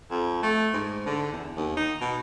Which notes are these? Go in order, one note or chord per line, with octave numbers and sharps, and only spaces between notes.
F2
A3
G#2
D3
E2
D#2
D#4
B2